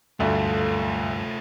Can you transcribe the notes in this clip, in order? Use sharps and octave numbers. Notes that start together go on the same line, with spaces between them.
D2 G2 A3 F4 A4